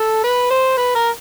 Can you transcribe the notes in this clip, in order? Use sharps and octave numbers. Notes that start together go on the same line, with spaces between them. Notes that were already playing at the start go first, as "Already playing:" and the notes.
Already playing: A4
B4
C5
B4
A#4